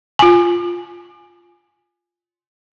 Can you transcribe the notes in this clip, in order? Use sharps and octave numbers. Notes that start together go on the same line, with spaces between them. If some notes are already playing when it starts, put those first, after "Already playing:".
F4 G#5